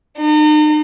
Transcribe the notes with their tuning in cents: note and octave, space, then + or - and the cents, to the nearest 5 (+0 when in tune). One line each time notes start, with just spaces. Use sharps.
D#4 -40